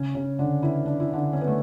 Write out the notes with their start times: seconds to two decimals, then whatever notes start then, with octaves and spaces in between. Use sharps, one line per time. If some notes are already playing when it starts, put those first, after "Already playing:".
Already playing: C#3 C#4
0.15 C#3 C#4
0.39 D3 D4
0.63 E3 E4
0.86 D4
1.00 E4
1.13 D3 D4
1.33 C#4
1.41 B3
1.48 A3